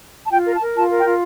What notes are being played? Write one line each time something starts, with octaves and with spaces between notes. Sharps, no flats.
A5
F4 G5
A#4
A5
A#4
F4 A5
A#4
G5
F4